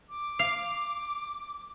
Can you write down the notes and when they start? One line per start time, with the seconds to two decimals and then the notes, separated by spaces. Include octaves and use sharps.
0.10 D6
0.39 F5